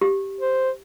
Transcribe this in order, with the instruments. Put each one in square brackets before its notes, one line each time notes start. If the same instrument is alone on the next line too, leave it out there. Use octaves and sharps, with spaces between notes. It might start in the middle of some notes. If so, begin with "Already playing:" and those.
[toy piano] G4
[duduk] C5